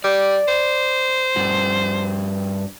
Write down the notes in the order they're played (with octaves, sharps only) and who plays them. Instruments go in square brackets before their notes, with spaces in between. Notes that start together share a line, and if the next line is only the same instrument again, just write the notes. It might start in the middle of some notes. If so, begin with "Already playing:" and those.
[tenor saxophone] G3 [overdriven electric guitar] D5
[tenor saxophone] C5
[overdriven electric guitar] G2 F#4